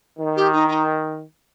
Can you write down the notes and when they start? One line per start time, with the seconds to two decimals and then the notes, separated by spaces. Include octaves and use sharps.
0.19 D#3
0.36 G4
0.52 D#4
0.67 D#4